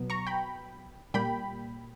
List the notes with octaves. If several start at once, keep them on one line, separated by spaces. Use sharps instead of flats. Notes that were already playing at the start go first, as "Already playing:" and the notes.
Already playing: B2 F#3 B3
A#5 C#6
G5 B5
A#2 G3 A#3 G5 B5